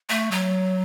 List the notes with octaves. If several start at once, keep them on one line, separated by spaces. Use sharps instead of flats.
A3
F#3